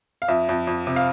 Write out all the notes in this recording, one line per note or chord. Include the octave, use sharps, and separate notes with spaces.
F5
F2 E5
F2
F2
C3
F5